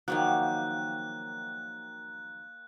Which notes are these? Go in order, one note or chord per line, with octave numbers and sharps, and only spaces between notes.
D#3 F3 F#3 A#3 G5 F#6